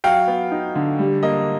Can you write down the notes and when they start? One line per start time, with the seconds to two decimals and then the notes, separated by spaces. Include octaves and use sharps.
0.04 F#3 F5 G5
0.27 B3
0.52 D#4
0.75 D3
0.99 G3
1.23 A#3 D#5